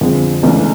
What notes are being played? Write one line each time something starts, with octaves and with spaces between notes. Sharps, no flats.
F2 D3 F3 G#3
C#2 C#3 E3 A3 D4